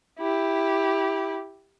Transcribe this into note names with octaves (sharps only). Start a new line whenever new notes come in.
E4 G4